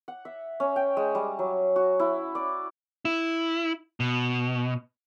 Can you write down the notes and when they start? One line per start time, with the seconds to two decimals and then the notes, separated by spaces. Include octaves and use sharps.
0.08 F#5
0.25 E5
0.60 C#4
0.76 G5
0.97 G#3
1.15 G3
1.39 F#3
1.76 F#4
2.00 E4
2.35 D5
3.05 E4
4.00 B2